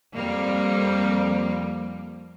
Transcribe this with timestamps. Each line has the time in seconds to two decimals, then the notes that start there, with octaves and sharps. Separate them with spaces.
0.14 F2 G3 A#3